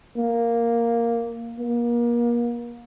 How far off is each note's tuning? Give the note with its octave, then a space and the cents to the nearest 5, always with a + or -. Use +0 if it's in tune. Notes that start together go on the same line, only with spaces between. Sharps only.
A#3 +0
A#3 +35